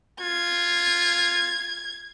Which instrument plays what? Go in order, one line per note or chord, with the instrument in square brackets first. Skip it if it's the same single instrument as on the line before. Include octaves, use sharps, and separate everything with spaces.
[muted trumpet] F4 [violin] G#6